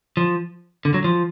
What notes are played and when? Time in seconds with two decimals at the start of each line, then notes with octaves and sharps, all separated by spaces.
0.17 F3
0.85 D3
0.94 F#3
1.04 F3